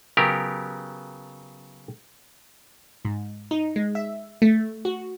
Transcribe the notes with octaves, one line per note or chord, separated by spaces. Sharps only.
C#3 F#3 B3 G4 A#4
G#2
D#4
G#3
E5
A3
F#4